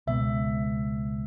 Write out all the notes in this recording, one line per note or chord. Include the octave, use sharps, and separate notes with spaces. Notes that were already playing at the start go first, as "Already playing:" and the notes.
C#2 B2 G#3 B3 E5